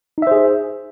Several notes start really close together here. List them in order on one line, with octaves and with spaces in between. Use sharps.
D#4 E5 C5 G#4